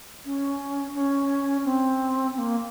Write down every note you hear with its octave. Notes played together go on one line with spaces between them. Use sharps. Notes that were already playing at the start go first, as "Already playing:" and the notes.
C#4
C#4
C4
C4
A#3